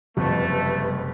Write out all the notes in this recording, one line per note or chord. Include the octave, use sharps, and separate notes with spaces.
F#1 F2 C3 G3 A3 B4